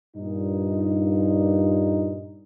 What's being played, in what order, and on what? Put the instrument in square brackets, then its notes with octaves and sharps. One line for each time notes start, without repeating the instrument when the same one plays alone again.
[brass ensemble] G2 A#2 D#4